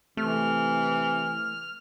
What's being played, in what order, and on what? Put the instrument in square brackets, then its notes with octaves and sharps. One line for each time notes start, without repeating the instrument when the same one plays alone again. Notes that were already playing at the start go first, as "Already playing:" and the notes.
[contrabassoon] C3 [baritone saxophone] E3 [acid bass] A3 [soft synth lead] F6